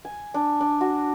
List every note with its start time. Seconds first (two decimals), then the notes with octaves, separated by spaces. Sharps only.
0.05 G#5
0.34 D4
0.61 D4
0.81 F#4